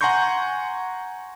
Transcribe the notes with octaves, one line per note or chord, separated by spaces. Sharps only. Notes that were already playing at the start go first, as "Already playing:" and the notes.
F#5 G#5 A#5 C6 C#6 G6